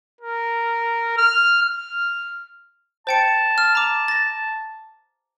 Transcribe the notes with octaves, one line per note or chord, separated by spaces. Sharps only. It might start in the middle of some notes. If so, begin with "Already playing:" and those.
A#4
F6
F6
C5 G5 A5 C#7
F6
A#5 D6
A6 A#6